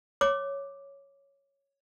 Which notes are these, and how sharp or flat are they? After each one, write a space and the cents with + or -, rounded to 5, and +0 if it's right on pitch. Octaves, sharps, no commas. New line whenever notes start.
C#5 +0 D6 +0